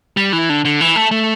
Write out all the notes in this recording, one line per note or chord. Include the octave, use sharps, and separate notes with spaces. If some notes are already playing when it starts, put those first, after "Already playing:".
G3
E3
D3
D3
E3
A3
A3